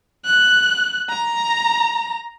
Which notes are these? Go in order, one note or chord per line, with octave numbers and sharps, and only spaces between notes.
F#6
A#5